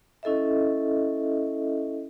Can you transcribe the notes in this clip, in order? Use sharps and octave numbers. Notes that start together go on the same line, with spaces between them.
C#4 E4 A4 D#5 E5